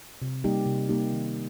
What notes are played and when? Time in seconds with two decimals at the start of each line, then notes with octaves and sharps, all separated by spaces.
0.22 C3
0.44 G3 A#3 D#4 G4
0.66 C3
0.89 G3 A#3 D#4 G4
1.13 D#3